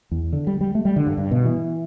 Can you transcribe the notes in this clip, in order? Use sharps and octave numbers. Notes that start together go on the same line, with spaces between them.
E2
D3
G3
G3
A3
G3
D3
G2
G2
B2
E3